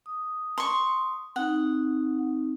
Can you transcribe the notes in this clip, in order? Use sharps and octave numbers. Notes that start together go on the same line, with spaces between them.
D#6
C6 C#6
C4 D#4 F#5